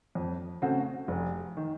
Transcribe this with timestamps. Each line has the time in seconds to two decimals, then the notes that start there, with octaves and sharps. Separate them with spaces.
0.15 F2
0.62 C#3 A3 C4 F#4
1.08 F1
1.57 D#3